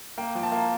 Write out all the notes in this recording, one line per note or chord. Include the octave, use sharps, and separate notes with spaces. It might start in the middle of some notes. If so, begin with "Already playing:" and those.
A#3 G5
F3
A5
A#3